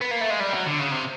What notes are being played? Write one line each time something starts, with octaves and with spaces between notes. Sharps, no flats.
B3
A#3
A3
G#3
G3
F#3
D3
C#3
C3